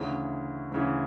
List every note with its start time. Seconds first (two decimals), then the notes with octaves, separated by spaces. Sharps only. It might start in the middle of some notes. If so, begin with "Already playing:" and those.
Already playing: D2 C#3 E3
0.71 D2 C#3 E3